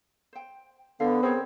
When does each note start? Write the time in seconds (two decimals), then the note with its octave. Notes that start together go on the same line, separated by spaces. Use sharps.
0.33 C5 G5
1.00 D3 B3 F5
1.23 C4 G#4 A#4 C#5